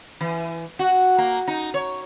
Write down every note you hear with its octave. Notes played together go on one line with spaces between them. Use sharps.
E3
F#4
A#3
D#4
C#5